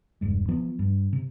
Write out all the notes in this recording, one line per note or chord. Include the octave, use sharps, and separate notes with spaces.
E1 G2 G#3
F3 B3
G2
C3